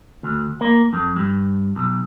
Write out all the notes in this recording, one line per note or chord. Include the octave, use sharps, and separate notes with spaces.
D2
A#3
F2
G2
B1